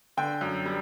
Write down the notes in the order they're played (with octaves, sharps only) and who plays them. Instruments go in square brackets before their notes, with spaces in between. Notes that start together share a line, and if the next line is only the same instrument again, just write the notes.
[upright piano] D3 G5
F#2
G3